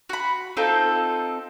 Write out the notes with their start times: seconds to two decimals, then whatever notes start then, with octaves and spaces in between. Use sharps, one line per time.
0.09 F#4 B5
0.57 C4 D#4 F4 A4